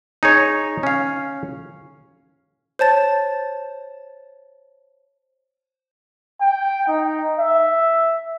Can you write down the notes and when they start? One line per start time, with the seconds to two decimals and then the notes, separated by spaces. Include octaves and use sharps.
0.23 D#4 G#4 C#5
0.83 C#4 F5
2.79 C5 C#5 A5 A6
6.41 G5
6.87 D#4
7.39 E5